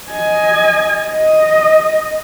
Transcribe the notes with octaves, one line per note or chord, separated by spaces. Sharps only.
D#5 G#5
D#5